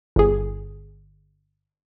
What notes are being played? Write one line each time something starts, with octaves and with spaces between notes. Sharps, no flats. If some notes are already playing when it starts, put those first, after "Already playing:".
G1 G#4